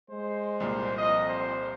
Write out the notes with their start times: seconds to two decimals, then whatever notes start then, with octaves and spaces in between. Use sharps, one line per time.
0.10 G#3 C5
0.60 C2 A#2
0.98 F2 D#5
1.29 C5